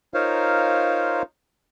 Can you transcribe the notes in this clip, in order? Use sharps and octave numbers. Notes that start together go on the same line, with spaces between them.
D#4 F4 A#4 C5 C#5 F5